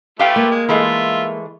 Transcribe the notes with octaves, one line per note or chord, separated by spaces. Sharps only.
A3 F4 G4 B4 F5 G5
A#3
G#3
E3 G#3 A3 F4 E5